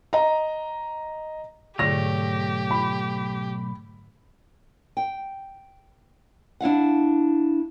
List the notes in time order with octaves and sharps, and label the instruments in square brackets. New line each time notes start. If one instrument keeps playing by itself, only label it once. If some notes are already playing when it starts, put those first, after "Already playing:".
[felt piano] D#5 A#5
[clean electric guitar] B1 A3 C#5 [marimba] G#2 D3 [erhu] G4 [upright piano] A#6
[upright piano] B5
[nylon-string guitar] G5
D4 E4 F5 F#5